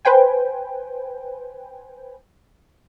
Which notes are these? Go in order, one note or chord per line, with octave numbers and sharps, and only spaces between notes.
B4 C5 G5 G#5